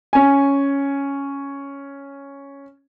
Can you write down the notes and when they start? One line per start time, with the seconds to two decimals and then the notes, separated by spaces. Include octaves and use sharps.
0.13 C#4 G#5